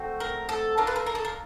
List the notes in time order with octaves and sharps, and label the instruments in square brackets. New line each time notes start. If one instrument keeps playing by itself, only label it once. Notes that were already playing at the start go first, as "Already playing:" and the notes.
Already playing: [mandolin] A3 C4 F#4
A#4
A4
D4 F4 A4 A#4
B4
A#4
A#4
A4
A#4